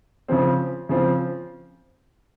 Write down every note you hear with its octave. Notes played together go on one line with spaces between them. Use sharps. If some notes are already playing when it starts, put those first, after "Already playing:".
C#3 F3 C4
C#3 F3 C4